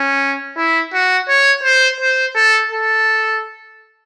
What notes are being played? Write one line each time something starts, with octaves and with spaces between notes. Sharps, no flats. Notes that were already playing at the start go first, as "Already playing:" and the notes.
Already playing: C#4
E4
F#4
C#5
C5
C5
A4
A4